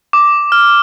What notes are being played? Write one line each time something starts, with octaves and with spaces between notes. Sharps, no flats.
D6
F6